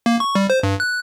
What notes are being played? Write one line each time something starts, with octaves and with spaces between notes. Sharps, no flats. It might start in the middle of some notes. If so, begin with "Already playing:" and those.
A#3
C#6
G3
C5
G2
F#6